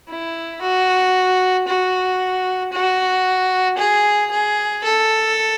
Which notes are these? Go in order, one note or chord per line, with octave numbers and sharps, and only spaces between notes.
E4
F#4
F#4
F#4
G#4
G#4
A4